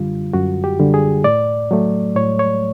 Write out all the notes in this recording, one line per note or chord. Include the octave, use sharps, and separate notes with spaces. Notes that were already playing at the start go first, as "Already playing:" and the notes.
Already playing: F#2 D3 G3 F4
F#2 F#4
G4
D3 G3
G#4
A2 D5
F#3 A3
A2 C#5
C#5